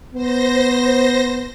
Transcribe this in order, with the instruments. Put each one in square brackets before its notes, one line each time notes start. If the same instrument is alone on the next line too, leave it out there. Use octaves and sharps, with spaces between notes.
[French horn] B3 [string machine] C5 A#6